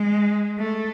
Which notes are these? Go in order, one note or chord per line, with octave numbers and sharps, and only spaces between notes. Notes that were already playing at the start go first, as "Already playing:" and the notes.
Already playing: G#3
A3